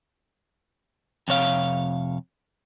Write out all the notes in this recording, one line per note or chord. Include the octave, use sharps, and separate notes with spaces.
F2 C3 C#5 F5